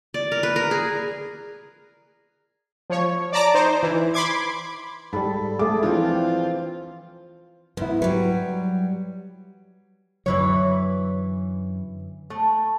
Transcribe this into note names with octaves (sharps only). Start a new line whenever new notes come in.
D5
A#4
B4
A#4
G#4
F3 C#5
D5 A5 A#5 D6
D#4 C5
E3
B5 C6 D6 G#6
G#2 G3 A4 B5
G#3 A3 G#4 D6
E3 F3 C4 D4 F4
G5
G#2 B3 E4
F#3 G3 B4
F#2 D3 E3 F#3 B4 C#5
A3